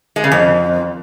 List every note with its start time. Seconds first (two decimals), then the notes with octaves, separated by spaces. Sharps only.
0.16 G#3
0.24 C#3
0.32 F2